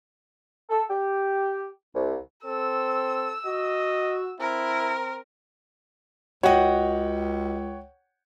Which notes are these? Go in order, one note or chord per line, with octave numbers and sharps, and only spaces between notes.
A4
G4
C2
C4 A4 E6
F#4 D#5
C4 E4 A#4
C#2 F#4 C#5 D#5 F#5 G5